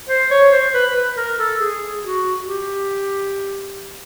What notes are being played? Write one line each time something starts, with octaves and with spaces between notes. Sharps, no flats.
C5
C#5
C5
B4
B4
A#4
A4
G#4
F#4
G4